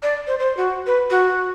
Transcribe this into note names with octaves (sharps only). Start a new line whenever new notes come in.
D5
C5
C5
F#4
B4
F#4